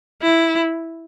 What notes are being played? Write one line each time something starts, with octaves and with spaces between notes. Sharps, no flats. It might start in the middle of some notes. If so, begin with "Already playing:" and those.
E4